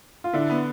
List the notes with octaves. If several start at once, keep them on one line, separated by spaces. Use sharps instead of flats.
F4
D3 D4 E4
B3